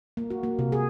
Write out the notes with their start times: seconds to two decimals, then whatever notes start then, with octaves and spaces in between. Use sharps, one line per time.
0.17 A#3
0.30 F#4
0.43 A#3
0.59 C3
0.72 G#4